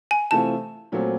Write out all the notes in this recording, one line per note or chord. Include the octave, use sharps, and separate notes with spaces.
G#5
C3 E3 A3 C4 F4 A5
A#2 F#3 A3 C4